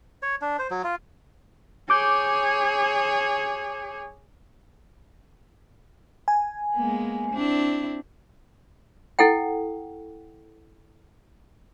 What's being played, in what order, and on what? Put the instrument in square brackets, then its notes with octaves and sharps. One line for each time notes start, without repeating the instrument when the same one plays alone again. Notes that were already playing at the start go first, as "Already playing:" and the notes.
[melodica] C#5
D4
C5
F#3
F4
[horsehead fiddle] G#4 C#5 [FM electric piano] D6 G6
[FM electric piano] G#5
[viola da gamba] G#3 A#3 B3
C4 D4 E4
[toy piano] E4 A4 F#5 G5